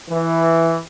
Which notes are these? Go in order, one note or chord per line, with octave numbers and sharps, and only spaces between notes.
E3